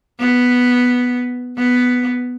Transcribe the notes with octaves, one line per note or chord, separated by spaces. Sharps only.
B3
B3